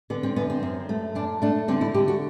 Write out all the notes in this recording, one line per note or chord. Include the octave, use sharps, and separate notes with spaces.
D3 B3
C4
F#2 B3
C4
F#2
A3
F#2 D4
A3 D4
D3 C4
E4
D3 G4
F#4